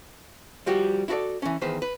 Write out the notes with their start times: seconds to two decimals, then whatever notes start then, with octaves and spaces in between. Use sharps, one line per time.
0.66 F3 G3 F#4 G4
1.08 E4 F#4 G4 A4 D5
1.42 E3 C#4
1.62 E2 D#3 B4 C5
1.82 B4